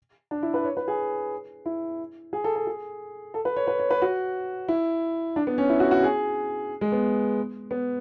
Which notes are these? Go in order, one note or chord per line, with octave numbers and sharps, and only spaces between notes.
D4
E4
B4
C#5
B4
G#4
E4
G#4
A4
A4
G#4
A4
B4
C#5
B4
C#5
B4
F#4
E4
D4
B3
C#4
E4
F#4
F#4
G#4
G#3
B3
B3